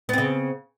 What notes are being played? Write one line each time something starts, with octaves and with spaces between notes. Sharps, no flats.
C#3 B3 C4